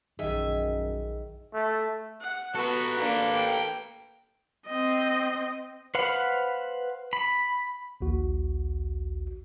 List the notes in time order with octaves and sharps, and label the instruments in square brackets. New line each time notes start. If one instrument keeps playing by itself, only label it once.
[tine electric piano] A#1 G#4 [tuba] F#2 [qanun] D#3 G#5 [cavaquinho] E5
[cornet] A3
[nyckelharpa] F#5
[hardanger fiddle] B3 [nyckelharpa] F#4 [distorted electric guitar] A4 B4
[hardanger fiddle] A#3 [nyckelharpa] D4
[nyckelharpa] G5
[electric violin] C4 D#5
[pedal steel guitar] B4 C5 F5 F#5 B5
B5
[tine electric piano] A#1 D#2 F#4